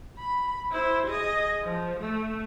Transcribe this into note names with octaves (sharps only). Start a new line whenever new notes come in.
B5
E4 C5
G#4 D#5
F3
A3